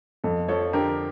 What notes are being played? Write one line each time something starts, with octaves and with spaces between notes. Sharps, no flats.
F2 A4
F3 A4 C#5
D3 G4 A#4